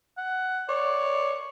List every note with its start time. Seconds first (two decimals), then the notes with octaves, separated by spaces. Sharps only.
0.18 F#5
0.69 C#5 D5